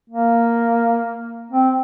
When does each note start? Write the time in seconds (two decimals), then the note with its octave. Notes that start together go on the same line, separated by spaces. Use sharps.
0.10 A#3
1.51 C4